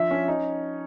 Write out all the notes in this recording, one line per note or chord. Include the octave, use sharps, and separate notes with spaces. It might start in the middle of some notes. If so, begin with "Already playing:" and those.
Already playing: F3 D4 E5
C#4
D#4